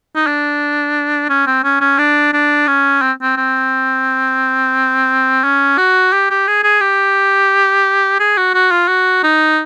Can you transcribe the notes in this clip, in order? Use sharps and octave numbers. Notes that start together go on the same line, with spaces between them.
D#4
D4
C#4
C4
C#4
C#4
D4
D4
C#4
C4
C4
C4
C#4
F#4
G4
G4
G#4
G#4
G4
G#4
F#4
F#4
F4
F#4
D#4